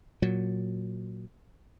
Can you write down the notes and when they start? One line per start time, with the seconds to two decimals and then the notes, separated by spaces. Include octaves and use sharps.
0.22 A#2 F#3